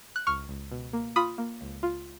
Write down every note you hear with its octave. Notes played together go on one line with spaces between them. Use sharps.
F#6
C#2 C#6 F6
C#2
B2
A#3
F4 B5 D#6
A#3
C#2
F4